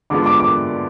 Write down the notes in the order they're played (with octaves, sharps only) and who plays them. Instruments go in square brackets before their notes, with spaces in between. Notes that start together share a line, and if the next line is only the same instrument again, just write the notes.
[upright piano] D3 G#3 B3 F4 [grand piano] D6
[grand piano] D6
D6